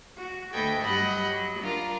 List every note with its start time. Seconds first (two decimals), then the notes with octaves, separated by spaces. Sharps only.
0.17 F#4
0.53 D2 A4 B4 D#5 G5 G#6
0.82 G2 F#3 G4 D#5 F#5 B5
1.27 F#3
1.61 D4 F4 A#4